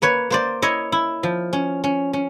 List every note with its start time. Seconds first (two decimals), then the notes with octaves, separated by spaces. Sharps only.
0.02 A#3 B4 C#5
0.30 A#3 C5 D5
0.62 E4 C#5 D#5
0.92 E4
1.23 F3
1.53 C#4
1.84 C#4
2.13 C#4